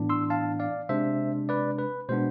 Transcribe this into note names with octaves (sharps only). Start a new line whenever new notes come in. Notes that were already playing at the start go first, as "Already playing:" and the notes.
Already playing: A2 E3 B3 D4
C6 E6
F5 A5
D5 F5
C3 G#3 D4 C5 E5
B4 D5
B4
B2 G#3 B3 D4 C5